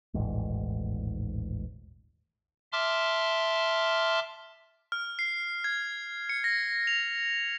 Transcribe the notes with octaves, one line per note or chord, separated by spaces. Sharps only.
D#1 A1 G#2
E5 A5 C6 D6 F6
F6
C7
G#6
C#7
A#6
F7